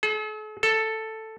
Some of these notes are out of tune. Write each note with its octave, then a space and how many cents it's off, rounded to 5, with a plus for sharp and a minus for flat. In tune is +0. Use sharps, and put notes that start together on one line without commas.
A4 -45
A4 +5